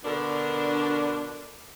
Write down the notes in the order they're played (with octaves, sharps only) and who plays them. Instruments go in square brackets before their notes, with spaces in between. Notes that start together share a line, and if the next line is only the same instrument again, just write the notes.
[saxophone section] B2 D3 D4 A#4